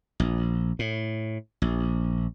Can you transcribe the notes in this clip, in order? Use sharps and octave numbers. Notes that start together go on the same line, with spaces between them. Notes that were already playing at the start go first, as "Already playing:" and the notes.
A#1
A2
A#1